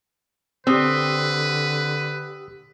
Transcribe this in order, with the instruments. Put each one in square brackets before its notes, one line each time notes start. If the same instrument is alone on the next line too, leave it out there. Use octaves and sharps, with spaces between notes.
[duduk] D3 [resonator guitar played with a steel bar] C4 [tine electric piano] G4 D#6 E6 [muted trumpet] B4